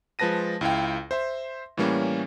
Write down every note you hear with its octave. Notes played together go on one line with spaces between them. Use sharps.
F3 G#3 B4 A5 A#6 D#7
C#2 E4 F5 G5
C5 E5 C6
A2 E3 G3 A#3 C#4